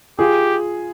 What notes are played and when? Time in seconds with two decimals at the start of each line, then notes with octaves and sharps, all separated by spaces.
0.19 F4 G4 G#4